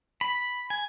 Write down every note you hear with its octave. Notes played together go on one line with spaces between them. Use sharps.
B5
G#5